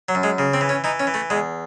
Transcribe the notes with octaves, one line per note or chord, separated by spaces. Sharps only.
F#3
F#2
G#3
C#3
C4
E3
C#4
E3 D#4
C#4
E3
A3
E2 G#3